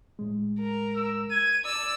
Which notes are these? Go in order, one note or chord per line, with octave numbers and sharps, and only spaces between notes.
A2 G#3
A#4
E6
G#6 D#7
D5 E6